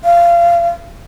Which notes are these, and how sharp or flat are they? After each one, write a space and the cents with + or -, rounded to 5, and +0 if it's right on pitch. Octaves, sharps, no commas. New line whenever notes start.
F5 -25